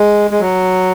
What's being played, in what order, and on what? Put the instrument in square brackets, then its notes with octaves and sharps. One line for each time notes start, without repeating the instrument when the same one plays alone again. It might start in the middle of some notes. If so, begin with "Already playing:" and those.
Already playing: [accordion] G#3
G#3
F#3